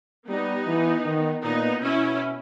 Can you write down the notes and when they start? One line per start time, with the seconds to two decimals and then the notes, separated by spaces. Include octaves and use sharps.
0.28 G3 B3 D#4
0.67 E3
1.05 D#3
1.43 A#2 B3 D#4
1.82 B2 C#4 E4